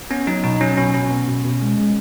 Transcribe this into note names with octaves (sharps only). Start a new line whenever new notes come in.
B3 C#4
F#3 D#4
B2 D#4
F#3 C#4
B2 C#4
B2 C#4
B3
B2
B2
G#3
G#3